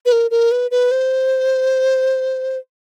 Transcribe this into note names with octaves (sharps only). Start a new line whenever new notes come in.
B4
A#4
A#4
B4
B4
C5